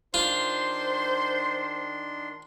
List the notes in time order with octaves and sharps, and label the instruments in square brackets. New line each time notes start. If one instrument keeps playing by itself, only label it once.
[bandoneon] D#3 D4 C6 [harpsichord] F4 [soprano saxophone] C5